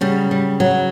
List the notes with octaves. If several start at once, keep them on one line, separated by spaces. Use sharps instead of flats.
C#3 F#3 G3
G3
F#3